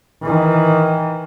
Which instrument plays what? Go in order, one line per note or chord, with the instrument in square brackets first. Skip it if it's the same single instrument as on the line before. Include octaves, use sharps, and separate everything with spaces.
[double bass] D#3 E3